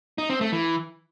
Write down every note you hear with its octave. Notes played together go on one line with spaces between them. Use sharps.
D#4
C4
A3
E3